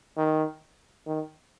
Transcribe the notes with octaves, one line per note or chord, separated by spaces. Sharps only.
D#3
D#3